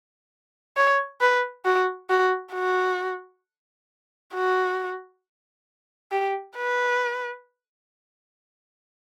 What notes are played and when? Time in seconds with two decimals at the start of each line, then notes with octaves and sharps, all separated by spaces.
0.77 C#5
1.21 B4
1.65 F#4
2.10 F#4
2.54 F#4
4.34 F#4
6.12 G4
6.56 B4